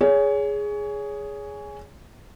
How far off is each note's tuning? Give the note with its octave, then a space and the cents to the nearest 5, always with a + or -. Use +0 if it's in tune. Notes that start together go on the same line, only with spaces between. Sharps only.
G#4 +0 C#5 +25